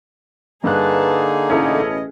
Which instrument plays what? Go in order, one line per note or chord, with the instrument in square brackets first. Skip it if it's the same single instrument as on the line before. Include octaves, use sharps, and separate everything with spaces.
[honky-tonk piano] G2 F#6 [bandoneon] D3 A#3 D#4 [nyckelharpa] G#4 [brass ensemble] B4 A5
[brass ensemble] A1 B2 D#5 [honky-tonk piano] C#4 E4 A4